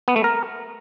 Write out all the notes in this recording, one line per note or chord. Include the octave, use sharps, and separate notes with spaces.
B3
A3
A#4